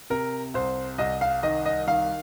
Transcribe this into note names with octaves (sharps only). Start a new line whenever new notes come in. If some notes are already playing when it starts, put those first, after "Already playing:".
C3 A#4
C2 C5
C2 D#5
F5
D#3 D#5
D#5
D#3 F5